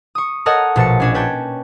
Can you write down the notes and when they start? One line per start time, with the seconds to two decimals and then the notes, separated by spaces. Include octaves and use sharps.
0.15 C#6 D#6
0.46 A4 A#4 C#5 D#5 F#5 A5
0.76 A#1 B2 A5 A6 C#7
1.00 C#4 D4 C#5
1.14 B4 C#5 G5 A5